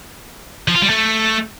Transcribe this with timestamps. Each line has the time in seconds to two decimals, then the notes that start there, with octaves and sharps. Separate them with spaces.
0.68 F3
0.75 F4
0.82 G3
0.89 A3